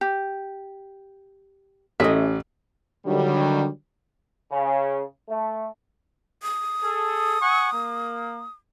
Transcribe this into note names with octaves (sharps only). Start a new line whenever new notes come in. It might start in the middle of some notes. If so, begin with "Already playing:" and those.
G4
A1 C#4 D#5 E5 D#6
D3 D#3 F#3 G3
C#3
A3
D#6
G#4 A4
F#5 G#5 C#6
A#3